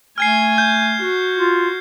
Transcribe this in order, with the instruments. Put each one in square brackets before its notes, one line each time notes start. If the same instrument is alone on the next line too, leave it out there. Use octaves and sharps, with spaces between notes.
[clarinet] A3 [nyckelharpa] G#5 [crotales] F6 G#6 C7
[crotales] G6
[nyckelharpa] F#4
[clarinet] F4